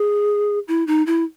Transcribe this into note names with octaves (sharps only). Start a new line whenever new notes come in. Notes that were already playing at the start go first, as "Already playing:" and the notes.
Already playing: G#4
E4
D#4
E4